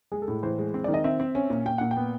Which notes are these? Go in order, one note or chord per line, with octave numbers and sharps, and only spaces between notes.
G#3 G#4
A4
A2
E3 C5
G#3
C4
D#3 D5
D#5
C4 E5
C4
C#4
A#2
A#2 G5
A#2 F#5
G5
B3